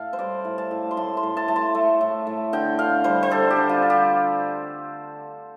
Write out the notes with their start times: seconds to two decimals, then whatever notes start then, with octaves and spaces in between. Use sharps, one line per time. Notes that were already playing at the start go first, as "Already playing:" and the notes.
Already playing: A2 A4 F5
0.13 C5
0.19 G3 D5
0.45 A2
0.58 A5
0.71 A2
0.91 C6
0.97 A2 A5
1.17 C6
1.23 A2
1.37 A5
1.48 A3 A5
1.56 C6
1.75 A3
2.01 A2
2.27 A2
2.53 D3 G5
2.79 D3 F5
3.04 G3 C5
3.23 C5
3.31 G3 A4
3.50 G4
3.56 D3
3.69 F4
3.82 D3
3.90 G4